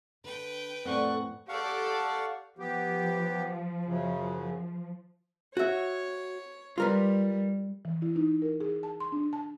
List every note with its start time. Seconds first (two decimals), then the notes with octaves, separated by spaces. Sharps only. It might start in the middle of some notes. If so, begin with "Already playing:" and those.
0.24 D3 B4 G5
0.85 F2 A2 C4 A4 D5 F#5 C#6
1.49 G4 A4 D5 F5 F#5 C#6
2.59 F3 B3 G4
3.85 F#2 C#3
5.57 F#4 C#5 E5
6.78 G3 F4 A#4 B4
7.85 E3
8.02 E4
8.16 D#4
8.42 A#4
8.60 G#4
8.83 A5
9.00 C6
9.12 D4
9.33 A5